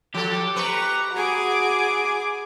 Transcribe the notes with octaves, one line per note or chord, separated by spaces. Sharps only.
F3 G4 A4
B4 A#5 C#6
F#4 G#4 G#5 D6